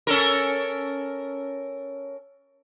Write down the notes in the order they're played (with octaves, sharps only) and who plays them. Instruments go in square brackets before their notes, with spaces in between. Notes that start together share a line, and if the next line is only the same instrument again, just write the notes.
[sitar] C#4 A4 A#4